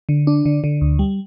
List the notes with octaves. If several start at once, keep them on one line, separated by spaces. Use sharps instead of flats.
D3
D4
D3
D3
D2
G3